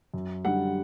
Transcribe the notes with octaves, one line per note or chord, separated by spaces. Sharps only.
F#2
D3 G3 F#5